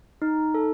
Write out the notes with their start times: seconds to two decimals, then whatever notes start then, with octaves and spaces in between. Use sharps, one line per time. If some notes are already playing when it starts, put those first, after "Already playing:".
0.22 D#4
0.54 A4